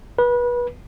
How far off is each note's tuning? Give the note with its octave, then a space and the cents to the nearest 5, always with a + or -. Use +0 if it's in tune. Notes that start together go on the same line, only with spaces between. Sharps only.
B4 -30